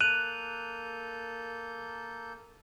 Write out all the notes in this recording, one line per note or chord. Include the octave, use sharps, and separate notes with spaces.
A#3 A4 F#6 G6 D#7 F7